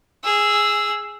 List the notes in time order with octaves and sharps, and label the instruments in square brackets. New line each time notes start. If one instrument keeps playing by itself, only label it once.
[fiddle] G#4 E6